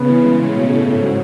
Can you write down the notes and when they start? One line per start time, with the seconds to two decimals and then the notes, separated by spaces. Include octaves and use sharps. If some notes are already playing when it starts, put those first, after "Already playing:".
Already playing: C#3 B3
0.09 E3
0.24 G#3
0.39 A2 C#4
0.55 B2
0.71 A3
0.86 G#2 C#4
1.01 F#3